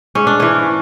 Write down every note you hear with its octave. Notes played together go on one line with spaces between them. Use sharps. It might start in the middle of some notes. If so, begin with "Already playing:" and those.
G#2 C#4
D4
E3 C#4